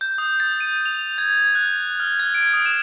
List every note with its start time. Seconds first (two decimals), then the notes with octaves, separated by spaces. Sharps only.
0.01 G6
0.18 D#6
0.40 A6
0.60 D#7
0.85 F7
1.18 G#6
1.55 F#6
2.00 F6
2.19 G#6
2.35 D7
2.54 D#6
2.66 E7